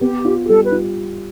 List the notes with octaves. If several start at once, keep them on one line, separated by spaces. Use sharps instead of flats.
B3 G4
F4
G4
G3 A4
B4
F4